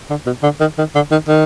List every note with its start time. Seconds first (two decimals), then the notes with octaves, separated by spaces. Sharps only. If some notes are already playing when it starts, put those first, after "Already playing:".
0.10 D3
0.26 B2
0.43 D3
0.60 D#3
0.78 D#3
0.95 D3
1.12 D#3
1.29 D#3